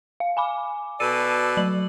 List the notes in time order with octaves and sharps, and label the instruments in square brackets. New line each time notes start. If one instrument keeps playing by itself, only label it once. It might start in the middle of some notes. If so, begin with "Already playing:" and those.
[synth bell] F5
G#5 B5 D6
[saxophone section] B2 A4 D5 [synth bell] D#7
[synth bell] F#3 F#7